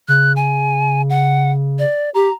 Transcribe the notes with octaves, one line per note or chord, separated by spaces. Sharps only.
C#3 F#6
G#5
F#5
D5
G4 A#5